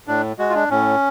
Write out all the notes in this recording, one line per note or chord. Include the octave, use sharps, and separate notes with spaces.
A2 D4
G#3 F#4
F4
D4
A2 C#4